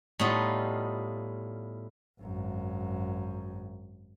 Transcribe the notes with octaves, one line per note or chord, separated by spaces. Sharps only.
A2 G3 B3 D#4 F4
G#1 F#2